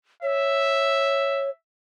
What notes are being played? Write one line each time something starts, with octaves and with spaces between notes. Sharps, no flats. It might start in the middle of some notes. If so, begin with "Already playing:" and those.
C#5 E5